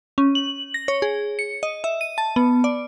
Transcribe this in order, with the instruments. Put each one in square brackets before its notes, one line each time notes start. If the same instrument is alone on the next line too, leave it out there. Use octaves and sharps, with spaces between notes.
[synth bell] C#4
F#7
A#6
C#5
G#4
C#7
D#5
E5
D#7
A5
B3
D5